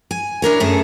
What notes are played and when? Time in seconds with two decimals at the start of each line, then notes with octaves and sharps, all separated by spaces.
0.11 G#5
0.42 E3 D4 A#4 C#5
0.60 F#2 A3 G#4 A4